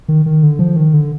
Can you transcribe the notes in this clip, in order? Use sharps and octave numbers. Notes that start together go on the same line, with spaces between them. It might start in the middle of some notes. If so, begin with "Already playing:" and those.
D#3
D#3
D3
F3
D#3
D3